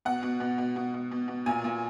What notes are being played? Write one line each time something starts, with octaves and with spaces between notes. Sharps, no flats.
B2 F#5
B2
B2
B2
B2
B2
B2
B2
A#2 G#5
A#2